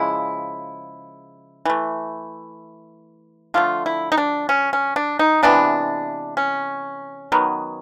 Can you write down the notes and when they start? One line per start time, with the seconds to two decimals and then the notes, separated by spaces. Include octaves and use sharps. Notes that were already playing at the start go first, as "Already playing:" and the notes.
Already playing: C#3 F3 G#3 E4
1.65 E3 A3
3.54 D3 F3 A3 F4
3.86 E4
4.12 D#4
4.17 D4
4.49 C#4
4.73 C#4
4.96 D4
5.19 D#4
5.43 C3 E3 G#3 B3 D4
6.37 C#4
7.32 D#3 F#3 B3